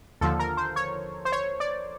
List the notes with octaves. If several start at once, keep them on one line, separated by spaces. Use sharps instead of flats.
D#2 D3 F3 A4
A#4
C5
C#5
C5
C#5
D5